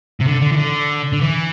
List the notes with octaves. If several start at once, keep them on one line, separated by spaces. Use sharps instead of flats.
C3
D3
D3
E3
D3
D3
E3